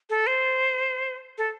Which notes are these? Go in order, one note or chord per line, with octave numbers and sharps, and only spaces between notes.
A4
C5
A4